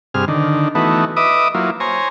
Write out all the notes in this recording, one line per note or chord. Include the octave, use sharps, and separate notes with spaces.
G2 C3 G#4 F6
D3 D#3
E3 A3 B3 D#4 F#4
B4 D#5 E5 D6 D#6
F#3 A#3 E4 F4
C5 C#5 G#5 A#5